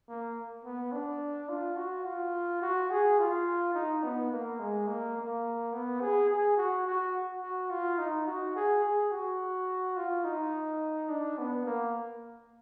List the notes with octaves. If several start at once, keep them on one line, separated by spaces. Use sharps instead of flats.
A#3
B3
D4
F4
F#4
F4
F#4
G#4
F4
D#4
B3
A#3
G#3
A#3
A#3
B3
G#4
G#4
F#4
F#4
F#4
F4
D#4
F#4
G#4
G#4
F#4
F4
D#4
D4
B3
A#3